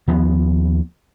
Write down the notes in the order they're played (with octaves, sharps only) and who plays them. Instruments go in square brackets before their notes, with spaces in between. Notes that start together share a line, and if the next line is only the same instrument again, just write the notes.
[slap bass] D#2 F3 B3